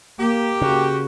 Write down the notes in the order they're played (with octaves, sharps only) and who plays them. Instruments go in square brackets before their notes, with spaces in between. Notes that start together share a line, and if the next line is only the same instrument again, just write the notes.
[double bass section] A#3 [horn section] G4
[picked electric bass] C#3 [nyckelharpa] F#4